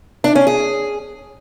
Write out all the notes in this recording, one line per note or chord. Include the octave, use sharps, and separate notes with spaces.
D4
C#4
G#4